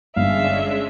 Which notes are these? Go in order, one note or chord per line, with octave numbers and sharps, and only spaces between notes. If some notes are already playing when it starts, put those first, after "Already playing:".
G1 G#3 C#4 D4 E5 F5